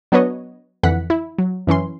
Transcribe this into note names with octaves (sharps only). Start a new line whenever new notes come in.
F#3 B3 D4 B4 C#5 D#5
F2 D3 E3 F#5 F#6 B6
E4
F#3
F#2 E3 C#4 C6